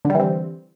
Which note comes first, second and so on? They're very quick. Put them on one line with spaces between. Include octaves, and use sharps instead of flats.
D3 G3 E3 C4